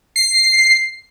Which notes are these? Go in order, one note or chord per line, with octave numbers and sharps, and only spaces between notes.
C7